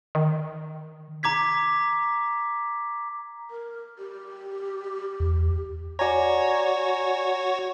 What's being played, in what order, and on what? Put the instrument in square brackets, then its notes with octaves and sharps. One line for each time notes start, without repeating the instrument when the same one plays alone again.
[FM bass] D#3
[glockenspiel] A#5 D6 G#6 B6
[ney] A#4
G4
[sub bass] E2
[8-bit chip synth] F#4 C#5 [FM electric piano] D5 G#5 A#5